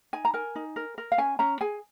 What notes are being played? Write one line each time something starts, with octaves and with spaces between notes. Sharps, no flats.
D#4 G#5
A#5
A#4 G#5
D#4
A#4
A#4
F5
C#4 G#5
C#4 A#5
G#4 G#5